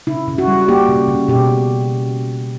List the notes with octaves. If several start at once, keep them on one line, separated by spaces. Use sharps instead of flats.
C#3 E4
C#3
F#4
G3
A#3 G4
C#3
C#3
B2 G4